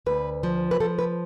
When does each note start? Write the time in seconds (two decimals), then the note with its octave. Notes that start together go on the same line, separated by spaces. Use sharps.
0.06 D2 B4
0.43 F3
0.71 B4
0.80 F3 A4
0.99 B4